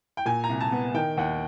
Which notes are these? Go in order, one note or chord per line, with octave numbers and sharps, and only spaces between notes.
G5
A#2 G#5
A#5
C2
A5
B3
D#3 G5
D#2 F#5